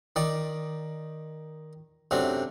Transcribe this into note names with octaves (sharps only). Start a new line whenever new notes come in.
D#3 D5
F#2 C3 A3 D4